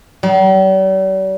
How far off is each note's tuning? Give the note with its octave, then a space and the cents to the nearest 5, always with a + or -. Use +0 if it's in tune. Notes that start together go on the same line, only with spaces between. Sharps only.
G3 -45